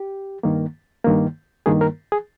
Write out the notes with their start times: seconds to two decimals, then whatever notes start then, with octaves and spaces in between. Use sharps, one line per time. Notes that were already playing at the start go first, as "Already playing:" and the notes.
Already playing: G4
0.43 G2 D#3 A#3
1.04 G2 D#3 A#3
1.66 G2 D#3 A#3 G#4
1.81 A#4
2.12 G#4